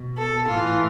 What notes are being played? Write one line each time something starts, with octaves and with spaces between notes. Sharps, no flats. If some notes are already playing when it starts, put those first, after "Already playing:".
Already playing: B2
A4
A2 E3 F4